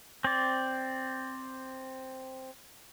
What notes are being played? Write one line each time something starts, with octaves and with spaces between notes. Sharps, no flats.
C4 D5